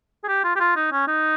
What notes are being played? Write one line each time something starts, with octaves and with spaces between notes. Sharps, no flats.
G#4
G4
F4
G4
F4
D#4
C#4
D#4